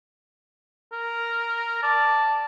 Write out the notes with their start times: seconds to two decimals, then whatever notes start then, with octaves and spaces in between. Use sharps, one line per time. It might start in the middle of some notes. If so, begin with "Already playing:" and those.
0.92 A#4
1.83 D5 A5